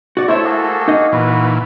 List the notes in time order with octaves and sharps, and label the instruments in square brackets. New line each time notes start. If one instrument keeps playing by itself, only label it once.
[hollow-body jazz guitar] F#4 D5
[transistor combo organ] A3 [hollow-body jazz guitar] E4 C5 E5 [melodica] C#5
[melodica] A#3 F#4 G#4
[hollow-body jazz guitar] D#4 D#5
[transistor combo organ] A#2 E3 [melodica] F#4 B4